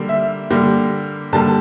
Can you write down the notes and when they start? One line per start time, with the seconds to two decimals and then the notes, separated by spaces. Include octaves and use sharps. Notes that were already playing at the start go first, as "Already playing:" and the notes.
Already playing: D3 G3 A#3
0.09 E5
0.50 D3 G3 A#3
1.33 D3 G3 A#3 A5